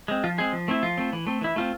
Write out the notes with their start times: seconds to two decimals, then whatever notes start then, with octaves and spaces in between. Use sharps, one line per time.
0.08 G#3 C4
0.24 F3 F4
0.38 G#3 C4 G#4
0.53 F3
0.68 A3 C4 E4
0.83 F3 F4
0.98 A3 C4
1.13 E3
1.27 A3 C4
1.41 E3 E4
1.56 A3 C4 F4